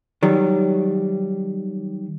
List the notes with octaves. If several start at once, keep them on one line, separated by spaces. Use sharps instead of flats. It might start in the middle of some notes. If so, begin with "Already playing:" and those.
D#3 F#3 G3